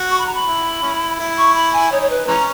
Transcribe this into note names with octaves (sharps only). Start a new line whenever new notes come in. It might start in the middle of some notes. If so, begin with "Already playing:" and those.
Already playing: F#4
C#6
B5
A#5
B5
E4
C#4 E4
E4
C#6
B5
G#5
D#4 C#5
C#5
B4
E3 G#3 C#4 A#5